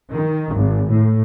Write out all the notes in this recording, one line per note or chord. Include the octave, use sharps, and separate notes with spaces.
D#3
G#1
A2